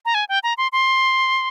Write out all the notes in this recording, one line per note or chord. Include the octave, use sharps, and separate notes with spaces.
A#5
G#5
G5
A#5
C6
C6